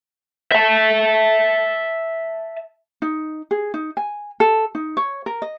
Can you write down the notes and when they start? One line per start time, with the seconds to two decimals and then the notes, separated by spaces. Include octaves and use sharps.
0.52 E5 A5
3.02 D#4
3.51 G#4
3.74 D#4
3.97 G#5
4.40 A4
4.75 D#4
4.97 C#5
5.26 A#4
5.42 D#5